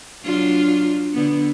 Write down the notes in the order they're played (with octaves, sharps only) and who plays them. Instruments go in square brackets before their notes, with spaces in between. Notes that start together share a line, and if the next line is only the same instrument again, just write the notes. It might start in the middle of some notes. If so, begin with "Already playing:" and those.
[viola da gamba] F#3 D4 F4
D3 B3